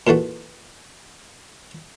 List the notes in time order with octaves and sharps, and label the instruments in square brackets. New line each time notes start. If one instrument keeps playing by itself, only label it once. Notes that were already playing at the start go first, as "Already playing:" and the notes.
[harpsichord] A#2 E3 A3 F#4